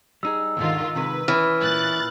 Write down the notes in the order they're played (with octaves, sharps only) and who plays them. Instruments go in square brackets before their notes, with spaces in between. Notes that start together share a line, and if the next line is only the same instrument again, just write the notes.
[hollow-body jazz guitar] G3 D#4 G#4 [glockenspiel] E6
[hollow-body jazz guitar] D#2 G#2 D3 [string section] D#3 F4
[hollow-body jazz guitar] C3 D#3 G#3 [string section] B4
[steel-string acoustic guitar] E3 [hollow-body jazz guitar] C#4 E4 [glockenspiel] F6
[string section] A#2 F#6 A6